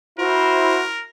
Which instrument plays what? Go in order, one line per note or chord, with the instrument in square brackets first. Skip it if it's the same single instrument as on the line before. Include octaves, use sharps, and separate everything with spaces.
[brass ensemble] E4 C5 [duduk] F#4 [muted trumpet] A#4